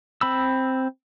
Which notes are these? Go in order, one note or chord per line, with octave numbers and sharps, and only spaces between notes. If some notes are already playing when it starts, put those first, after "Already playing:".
C4 B5 E6